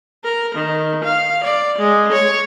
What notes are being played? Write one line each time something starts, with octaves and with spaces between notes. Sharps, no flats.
A#4
D#3
F5
D5
G#3
C#5